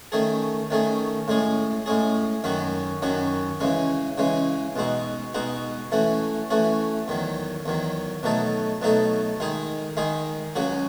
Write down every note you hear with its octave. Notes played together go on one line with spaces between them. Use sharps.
D#3 A3 C#4 G#4
D#3 A3 C#4 G#4
A2 G#3 C#4 G#4
A2 G#3 C#4 G#4
F#2 D#3 F#3 C#4 F#4
F#2 D#3 F#3 C#4 F#4
C#3 E3 G#3 C#4
C#3 E3 G#3 C#4
B2 G#3 D#4 F#4
B2 G#3 D#4 F#4
E3 A3 C#4 F#4
E3 A3 C#4 F#4
E2 D#3 F#3
E2 D#3 F#3
B2 F#3 A3 D#4 A4
B2 F#3 A3 D#4 A4
D#3 G#3 D#4 G#4
D#3 G#3 D#4 G#4
C#2 C#3 F#3 C#4 F#4